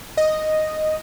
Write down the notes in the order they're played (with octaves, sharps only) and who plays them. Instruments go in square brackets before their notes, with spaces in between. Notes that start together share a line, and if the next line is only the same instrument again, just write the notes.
[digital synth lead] D#5